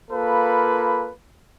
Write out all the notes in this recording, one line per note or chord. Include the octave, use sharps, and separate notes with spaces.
A#3 F4 A4 B4 F5 B5